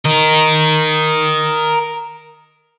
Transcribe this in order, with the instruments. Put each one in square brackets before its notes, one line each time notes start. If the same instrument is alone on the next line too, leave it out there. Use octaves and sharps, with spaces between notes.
[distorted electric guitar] A#4 D#5